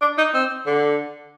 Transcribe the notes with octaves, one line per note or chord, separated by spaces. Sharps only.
D4
D#4
C4
D3